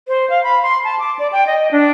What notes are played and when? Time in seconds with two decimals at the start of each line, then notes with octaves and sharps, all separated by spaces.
0.08 C5
0.30 F5
0.43 B5
0.62 C6
0.84 A5
0.99 D6
1.19 D5
1.32 G5
1.47 D#5
1.71 D4